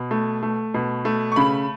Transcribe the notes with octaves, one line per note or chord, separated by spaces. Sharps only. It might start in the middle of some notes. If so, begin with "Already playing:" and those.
Already playing: B2
A3
A3
B2
A3
C#6
C#3 B5